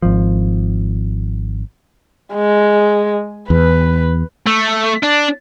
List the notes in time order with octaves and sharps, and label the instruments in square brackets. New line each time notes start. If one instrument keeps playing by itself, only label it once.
[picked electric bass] G#1 F3
[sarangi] G#3
[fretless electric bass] E2 [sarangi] B4
[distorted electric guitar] A3
D4